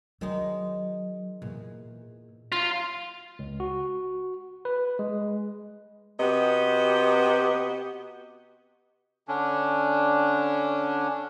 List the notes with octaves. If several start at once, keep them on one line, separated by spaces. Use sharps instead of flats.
D#3 F#3 G#3 D#4
E2 A#2
F#3 F4
C#2
F#4
B4
G#3
C3 B3 F#4 G4 D#5
D3 C#4 D4